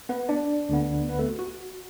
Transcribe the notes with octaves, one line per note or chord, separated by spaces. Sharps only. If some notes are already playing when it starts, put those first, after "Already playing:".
B3 B4
D4 D5
D2 D3 B3
B3 B4
A3 A4
F#4
F#4